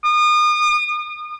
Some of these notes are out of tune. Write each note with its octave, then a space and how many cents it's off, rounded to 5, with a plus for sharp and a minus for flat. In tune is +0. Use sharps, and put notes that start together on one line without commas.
D#6 -35